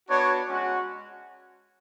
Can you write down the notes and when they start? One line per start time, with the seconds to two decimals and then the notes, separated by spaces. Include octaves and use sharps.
0.09 B3 D4 F#4 C#5
0.49 G#3 C#4 F#4